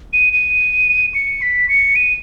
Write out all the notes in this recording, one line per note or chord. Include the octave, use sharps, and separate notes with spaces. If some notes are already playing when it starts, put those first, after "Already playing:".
D#7
D#7
C#7
B6
C#7
D#7